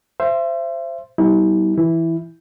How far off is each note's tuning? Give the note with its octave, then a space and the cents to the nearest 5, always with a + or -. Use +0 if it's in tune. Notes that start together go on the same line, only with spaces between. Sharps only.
C5 +0 E5 +35
G3 -35 B3 -5 E4 -45
E3 +0 E4 +0